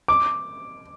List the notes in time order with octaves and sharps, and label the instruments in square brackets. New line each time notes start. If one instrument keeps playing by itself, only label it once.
[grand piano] D6